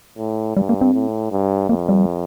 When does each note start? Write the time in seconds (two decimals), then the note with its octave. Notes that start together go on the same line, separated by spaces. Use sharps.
0.18 A2
0.57 G2 G3
0.69 A#3
0.81 C4
0.94 A2
1.32 G2
1.69 F2 A#3
1.89 G3